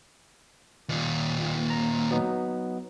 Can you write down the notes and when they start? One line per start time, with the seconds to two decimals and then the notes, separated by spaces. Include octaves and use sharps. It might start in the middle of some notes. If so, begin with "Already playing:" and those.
0.89 D#2 A#2
1.70 A#5
2.11 F#3 B3 D#4